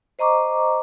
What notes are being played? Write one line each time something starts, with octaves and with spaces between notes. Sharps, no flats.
C5 D#5 A#5 C#6 D6